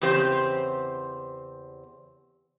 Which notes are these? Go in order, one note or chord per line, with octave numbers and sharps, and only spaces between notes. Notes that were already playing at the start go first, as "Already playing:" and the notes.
E2 C#3 C4 G4 C5